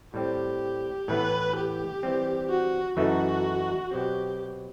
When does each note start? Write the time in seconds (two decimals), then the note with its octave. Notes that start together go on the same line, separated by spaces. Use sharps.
0.14 A2 G3 C4 G4
1.08 A2 E3 B3 B4
1.56 G4
2.03 E3 G3 C4
2.50 F#4
2.97 F#2 E3 A3 D#4 F#4 A4
3.91 B2 F#3 C4 G4